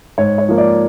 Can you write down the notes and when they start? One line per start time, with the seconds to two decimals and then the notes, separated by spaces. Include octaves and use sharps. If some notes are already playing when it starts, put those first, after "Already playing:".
0.18 G#2 C#5
0.38 C#5
0.48 F3 A#3
0.58 D5